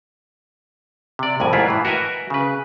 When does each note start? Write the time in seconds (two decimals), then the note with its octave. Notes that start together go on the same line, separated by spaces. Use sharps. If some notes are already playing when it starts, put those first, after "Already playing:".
1.19 C3 D5
1.40 C2 F2 A2 G#5
1.53 G#2 E4 F4 B4 D5
1.68 A2 E3
1.85 F#4 A#4 B4 D#5 E5 G#5
2.30 C#3 B4